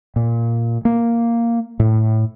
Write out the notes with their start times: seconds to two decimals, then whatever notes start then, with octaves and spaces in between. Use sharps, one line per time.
0.16 A#2
0.85 A#3
1.80 A2